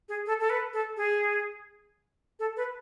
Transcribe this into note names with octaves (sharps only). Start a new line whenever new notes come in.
G#4
A4
A4
B4
A4
G#4
A4
B4